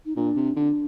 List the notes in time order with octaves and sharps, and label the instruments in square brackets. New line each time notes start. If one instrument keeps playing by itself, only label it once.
[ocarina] D#4
[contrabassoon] A#2 [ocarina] D4
[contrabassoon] C3
[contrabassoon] D3 [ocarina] D4